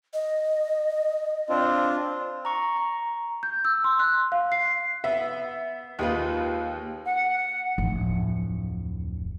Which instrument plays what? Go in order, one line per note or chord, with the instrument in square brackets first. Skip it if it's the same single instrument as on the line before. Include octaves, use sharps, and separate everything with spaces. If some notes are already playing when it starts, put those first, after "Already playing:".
[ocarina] D#5
[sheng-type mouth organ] C4 D4 F4
[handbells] A#5 C#6
A#5
[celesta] G6
E6
C6
F#6
F5
C7
[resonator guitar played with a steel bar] B3 [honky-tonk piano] E5
[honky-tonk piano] D#2 [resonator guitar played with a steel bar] G#3 F4 B4
[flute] F#5
[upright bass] D1 F2